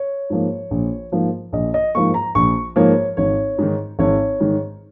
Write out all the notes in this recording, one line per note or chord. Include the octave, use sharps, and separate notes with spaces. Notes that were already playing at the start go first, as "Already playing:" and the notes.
Already playing: C#5
G#2 F3 A#3
A#1
G#2 F3 A#3
A#1 D#5
D#5
G#2 F3 A#3 C#6
A#5
A#1 C#6
G#2 F3 A#3 C#5
G#1 C#5
G#2 D#3
G#1 C#5
G#2 D#3